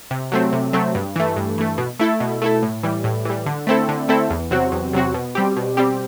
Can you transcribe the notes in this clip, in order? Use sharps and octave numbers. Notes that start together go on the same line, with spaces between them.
C3
F#3 A3 C4
C3
F#3 A3 C4
G2
E3 A3
G2
E3 A3
B2
A3 E4 A4
B2
A3 E4 A4
A2
E3 G3
A2
E3 G3
D3
A3 C4 E4 A4
D3
A3 C4 E4 A4
E2
C3 F#3 C4 F#4
E2
C3 F#3 C4 F#4
B2
G3 C4 G4
B2
G3 C4 G4